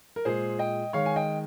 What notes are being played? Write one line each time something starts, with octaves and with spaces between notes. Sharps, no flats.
A#4
A#2 G#3 G#4 C5
D#5 G5
D#3 G#3 C#5 F5
G#5
D#5 G5